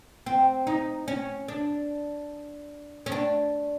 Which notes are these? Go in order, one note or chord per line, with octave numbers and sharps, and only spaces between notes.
C4
D#4
C#4
D4
C#4
D4